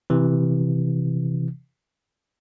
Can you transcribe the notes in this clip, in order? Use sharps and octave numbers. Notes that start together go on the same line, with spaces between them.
C3 E3